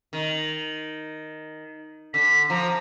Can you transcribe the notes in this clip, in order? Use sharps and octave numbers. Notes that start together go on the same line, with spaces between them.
D#3
D3 B6
F3 A#5